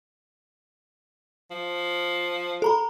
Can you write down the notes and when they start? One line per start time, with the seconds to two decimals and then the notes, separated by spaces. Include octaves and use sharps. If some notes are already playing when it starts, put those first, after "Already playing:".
1.51 F3
2.62 A4 A#5 B5